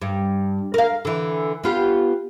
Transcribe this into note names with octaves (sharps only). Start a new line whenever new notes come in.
G2
A#4 F5
D3 E3
B3 F4 G4